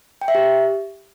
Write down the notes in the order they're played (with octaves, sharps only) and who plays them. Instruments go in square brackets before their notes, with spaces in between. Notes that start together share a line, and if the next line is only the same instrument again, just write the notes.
[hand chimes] G5
E5
G4